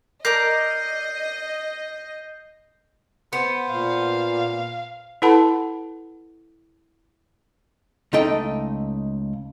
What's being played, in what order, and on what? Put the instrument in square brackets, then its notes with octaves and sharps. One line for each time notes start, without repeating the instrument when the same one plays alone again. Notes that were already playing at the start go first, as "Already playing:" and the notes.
[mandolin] A#4 D5 A#5 [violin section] D#5 [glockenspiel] G6 C7
[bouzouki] B3 [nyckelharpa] C5
[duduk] A#2 [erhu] F5
[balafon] E4 A4 B4 F#5 A5 B5
[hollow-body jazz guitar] C#2 A3 D#4 A4 D#5 G5